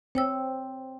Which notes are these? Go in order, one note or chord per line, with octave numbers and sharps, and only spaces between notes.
C4 C#5 G5 E6